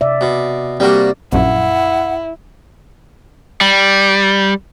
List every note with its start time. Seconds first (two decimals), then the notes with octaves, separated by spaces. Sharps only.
0.01 C3 D5 E5
0.21 B2
0.80 G3 A#3 C4 F#4 D5
1.33 A#1 F#2 E4 F#5
3.61 G3